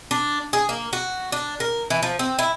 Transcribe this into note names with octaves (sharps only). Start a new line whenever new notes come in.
D4
G#4
A#3
F#4
D4
A#4
E3
F3
C4
E4